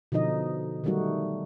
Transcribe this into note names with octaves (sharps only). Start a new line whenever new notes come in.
B2 D3 F3 D#4 D#5
D#3 F#3 G3 A3 D#4 F#4